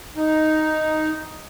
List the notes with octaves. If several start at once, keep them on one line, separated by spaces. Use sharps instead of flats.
D#4